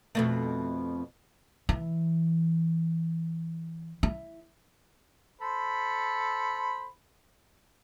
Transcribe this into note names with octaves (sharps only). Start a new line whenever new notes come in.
F2 B2 A3
E3
E4
A4 C5 B5